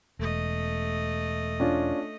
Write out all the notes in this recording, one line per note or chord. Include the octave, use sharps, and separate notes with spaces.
E1 A3 D#5
C#4 D4 F4